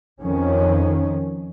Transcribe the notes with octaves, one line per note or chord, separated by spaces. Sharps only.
F2 D#3 F3 C#4